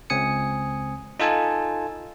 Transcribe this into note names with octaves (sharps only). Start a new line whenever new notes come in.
C#2 C4 G#5 D#6 C#7
D#4 F4 A4 G#5 A5